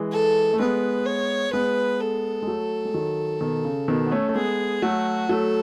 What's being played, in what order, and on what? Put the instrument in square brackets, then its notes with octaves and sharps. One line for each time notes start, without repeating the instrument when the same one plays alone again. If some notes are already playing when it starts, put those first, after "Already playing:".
Already playing: [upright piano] E3 G#3
[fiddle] A4
[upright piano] A3
[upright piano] G#3 B3 [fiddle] B4
[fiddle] C#5
[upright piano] G#3 B3 [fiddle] B4
[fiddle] A4
[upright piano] G#3
F#3 A3
G#3
D#3 F#3
B2 D#3
C#3
B2 D#3
B3
A3 C#4
A3
[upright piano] G#3 B3 [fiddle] G#4
[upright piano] F#3 A3 [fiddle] F#4
[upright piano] F#3 A3 [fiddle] A4